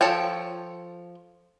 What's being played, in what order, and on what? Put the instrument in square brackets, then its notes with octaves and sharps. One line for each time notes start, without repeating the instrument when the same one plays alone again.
[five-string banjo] F3 A4 C#5 G5